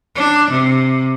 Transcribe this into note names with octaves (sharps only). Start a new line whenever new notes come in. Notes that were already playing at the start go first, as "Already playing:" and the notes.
D4
C3